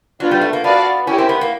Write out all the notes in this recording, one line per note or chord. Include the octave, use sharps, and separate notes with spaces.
F#3 B3 D4 F4
G3
A3
A#3
B3 F#4 B4 D5 F5 A5
C#4 E4 G4 A#4 C#5
C4
B3
A#3